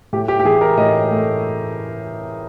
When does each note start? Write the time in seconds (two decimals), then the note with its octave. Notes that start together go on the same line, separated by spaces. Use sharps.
0.13 A2 G4
0.28 G4
0.40 G4
0.45 E3 G#4
0.61 A#4
0.77 A2 D#5
1.11 A3